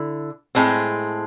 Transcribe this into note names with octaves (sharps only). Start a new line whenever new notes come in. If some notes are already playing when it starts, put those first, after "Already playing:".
Already playing: D3 E4
A2 G#3 C4